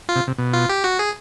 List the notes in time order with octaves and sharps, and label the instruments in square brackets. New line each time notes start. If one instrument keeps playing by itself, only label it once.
[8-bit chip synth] F4
[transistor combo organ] C3
C3
B2
[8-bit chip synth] F4
G4
F#4
G#4